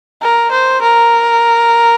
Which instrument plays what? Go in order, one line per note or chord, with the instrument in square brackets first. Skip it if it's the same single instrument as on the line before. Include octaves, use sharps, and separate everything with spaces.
[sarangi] A#4
C5
A#4